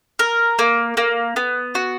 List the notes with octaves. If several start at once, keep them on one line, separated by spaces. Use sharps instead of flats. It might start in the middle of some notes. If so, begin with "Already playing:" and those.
A#4
A#3
A#3
B3
F#4